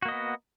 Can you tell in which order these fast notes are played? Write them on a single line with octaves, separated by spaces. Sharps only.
F#4 A#3 D#5 B3